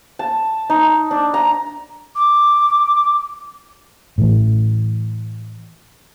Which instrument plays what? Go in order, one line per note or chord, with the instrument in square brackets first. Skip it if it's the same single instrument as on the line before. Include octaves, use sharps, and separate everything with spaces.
[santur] A5
D#4
D4
A#5
[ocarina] D6
[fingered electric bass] A2 E3